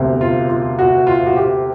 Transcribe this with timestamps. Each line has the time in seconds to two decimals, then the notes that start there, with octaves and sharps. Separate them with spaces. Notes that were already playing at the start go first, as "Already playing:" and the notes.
Already playing: E1 D2 C3
0.21 F4
0.49 F4
0.79 F#4
1.07 F4
1.26 F#4
1.36 G4